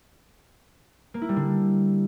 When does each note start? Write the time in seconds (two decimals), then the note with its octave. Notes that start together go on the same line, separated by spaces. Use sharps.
1.14 A#3
1.22 E4
1.29 G3
1.36 D3